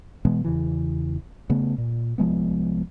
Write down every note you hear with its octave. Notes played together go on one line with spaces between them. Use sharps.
B2 E3 G#3 B3
E2 C#3 E3
C#3 A3 B3
A#2
C2 F3 G#3 B3